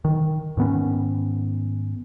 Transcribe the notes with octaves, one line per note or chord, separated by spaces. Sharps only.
D#3
G#2 D#3 B3 C#4